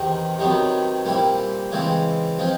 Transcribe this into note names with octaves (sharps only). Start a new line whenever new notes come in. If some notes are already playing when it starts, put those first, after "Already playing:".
Already playing: E2 C3 D#3
C3 D#3 F#3 B3
A#2 G3 C4 E4
C#3 E3 G#3 C4 E4
F3 G#3 C4